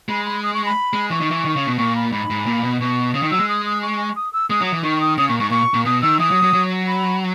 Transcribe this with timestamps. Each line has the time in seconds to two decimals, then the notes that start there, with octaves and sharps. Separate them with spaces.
0.09 G#3 B5
0.25 B5
0.43 D#6
0.54 C#6
0.65 B5
0.93 G#3
1.10 E3 C#6
1.20 D#3
1.31 E3
1.45 D#3
1.56 C#3
1.67 B2
1.78 A#2 C#6
1.96 B5
2.12 G#2 B5
2.30 G#2
2.46 A#2
2.63 B2
2.80 B2 C#6
3.14 C#3 D#6
3.22 D#3
3.31 F#3 E6
3.39 G#3
3.49 D#6
3.66 D#6
3.82 C#6
4.16 D#6
4.33 E6
4.50 G#3 D#6
4.61 F#3
4.67 D#6
4.72 E3
4.83 D#3 C#6
5.01 D#6
5.18 C#3 D#6
5.29 A#2 C#6
5.40 G#2 C#6
5.51 A#2 C#6
5.74 A#2
5.85 B2 D#6
6.02 D#3 E6
6.20 E3 D#6
6.31 F#3
6.42 F#3
6.53 F#3
6.87 B5